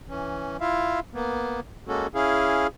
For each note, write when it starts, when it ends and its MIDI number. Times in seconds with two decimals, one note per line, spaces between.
0.09 0.57 52
0.09 0.57 61
0.61 1.00 64
0.61 1.00 65
0.61 1.00 76
0.61 1.00 77
1.14 1.60 58
1.14 1.60 59
1.88 2.07 56
1.88 2.07 58
1.88 2.07 61
1.88 2.07 66
1.88 2.07 69
2.15 2.67 61
2.15 2.67 64
2.15 2.67 68
2.15 2.67 77